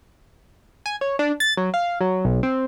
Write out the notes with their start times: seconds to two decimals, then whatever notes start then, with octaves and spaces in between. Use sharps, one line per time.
0.86 G#5
1.01 C#5
1.19 D4
1.40 A6
1.57 F#3
1.74 F5
2.01 F#3
2.25 B1
2.43 C4